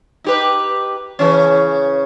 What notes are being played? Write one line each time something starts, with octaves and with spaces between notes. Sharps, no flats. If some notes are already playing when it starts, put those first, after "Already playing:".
D#4 G4 B4
C#3 E3 C#4